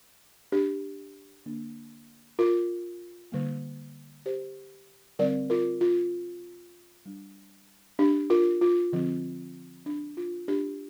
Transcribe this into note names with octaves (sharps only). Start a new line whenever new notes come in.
D4 G4
D3 A#3 D4
F4 A#4
D3 G3 A#3
G4 C5
D3 G3 C4 A#4 D5
F4 A#4
F4
G3 D4
D4 G4
F4 A#4
F4
D3 F3 C4
D4
F4
D4 G4